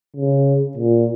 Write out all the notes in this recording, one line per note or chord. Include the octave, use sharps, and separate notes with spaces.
C#3
A#2